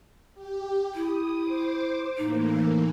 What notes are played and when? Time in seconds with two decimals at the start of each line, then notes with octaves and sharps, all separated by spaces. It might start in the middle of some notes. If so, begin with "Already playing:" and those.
0.35 G4
0.95 E4 D#6
1.42 C5 D6
2.18 A2 E3 A#3 D#4